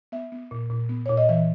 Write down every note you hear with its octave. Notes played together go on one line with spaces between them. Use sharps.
B3 E5
B3
A#2
A#2
B3
A#2 C#5
D#5
E3 E5